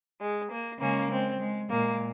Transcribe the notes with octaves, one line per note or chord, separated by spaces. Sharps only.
G#3
A#3
C#3 G#3 A#3 C#4
G#3 C4
G#3
A#2 G#3 A#3